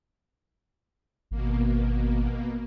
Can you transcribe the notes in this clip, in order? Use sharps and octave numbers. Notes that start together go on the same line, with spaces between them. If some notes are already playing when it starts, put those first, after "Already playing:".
G#1 B2 A#3